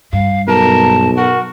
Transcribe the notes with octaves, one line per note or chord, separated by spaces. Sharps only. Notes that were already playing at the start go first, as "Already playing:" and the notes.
G2 F5
B1 A#4 A5
F#4 A#4